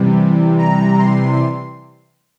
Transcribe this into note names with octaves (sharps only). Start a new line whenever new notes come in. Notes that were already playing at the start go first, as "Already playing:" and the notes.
Already playing: C3 E3 G3
A#5
C6